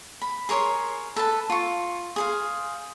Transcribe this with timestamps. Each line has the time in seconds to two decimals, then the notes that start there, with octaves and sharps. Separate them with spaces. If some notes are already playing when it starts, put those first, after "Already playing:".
0.22 B5
0.49 G#4 A#4 C#5 C6
1.16 A4 B4 A5
1.50 F4 C#6
2.16 G#4 C5 F5